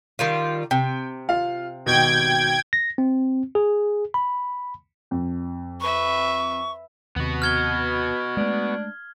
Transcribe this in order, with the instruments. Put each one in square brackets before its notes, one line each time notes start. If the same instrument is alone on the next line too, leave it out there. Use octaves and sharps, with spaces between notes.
[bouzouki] D#3 G3 F4
[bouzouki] C3 [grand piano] G5
[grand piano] F4 F5
[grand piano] G#1 B2 [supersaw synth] G5 G#6
[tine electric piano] A#6
C4
G#4
B5
[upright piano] F2
[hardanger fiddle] B4 E5 [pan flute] C#6
[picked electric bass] D#2 C3 [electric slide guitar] B3 F#4
[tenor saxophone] B2 [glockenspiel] F6 G#6 G7
[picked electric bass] G#3 A3 [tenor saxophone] D4